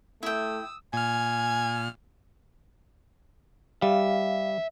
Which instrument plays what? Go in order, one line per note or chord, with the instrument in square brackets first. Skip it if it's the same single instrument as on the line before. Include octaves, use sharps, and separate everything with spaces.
[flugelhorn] A3 [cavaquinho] E4 G5 [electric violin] D#6 E6
[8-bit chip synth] A#2 F6 [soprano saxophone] G#5
[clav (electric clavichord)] G3 [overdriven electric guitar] E5 [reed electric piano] F5